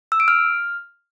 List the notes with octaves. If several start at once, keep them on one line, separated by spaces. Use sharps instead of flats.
E6
D7
F6